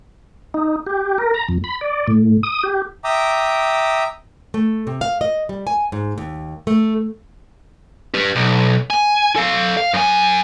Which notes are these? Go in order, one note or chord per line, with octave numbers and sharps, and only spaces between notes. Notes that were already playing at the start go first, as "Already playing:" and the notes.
D#4
G4
A#4
A#5
F2
B5
D5
A2
D#6
G4
E5 G5 A#5 D6 D#6
A3
C3
F5
D#5
G3
G#5
G#2
D#2
A3
G4 B4
B1
G#5
A4 F5
F5
F#2 G#5